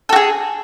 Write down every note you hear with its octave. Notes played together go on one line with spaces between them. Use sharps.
F#4 G#4 A4